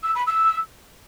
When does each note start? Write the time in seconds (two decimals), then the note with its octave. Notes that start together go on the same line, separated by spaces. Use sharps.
0.03 E6
0.15 B5
0.26 E6